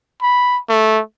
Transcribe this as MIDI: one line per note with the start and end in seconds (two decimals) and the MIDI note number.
0.21 0.59 83
0.69 1.00 57